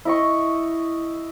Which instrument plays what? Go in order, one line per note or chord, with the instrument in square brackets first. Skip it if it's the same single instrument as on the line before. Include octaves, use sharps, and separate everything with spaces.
[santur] E4 D#5 C#6